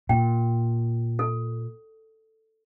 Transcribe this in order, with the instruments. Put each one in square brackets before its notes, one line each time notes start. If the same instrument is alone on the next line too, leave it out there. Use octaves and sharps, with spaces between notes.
[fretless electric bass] A#2 [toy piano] G5
[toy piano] A4